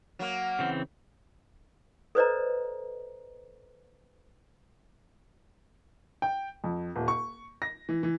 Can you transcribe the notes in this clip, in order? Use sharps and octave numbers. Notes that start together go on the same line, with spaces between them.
F#3 A#3
C#3 E3 C4
A4 B4 C5 D5 D#5 A#5
G5
F2
D#1
C#6
A#6
E3
E3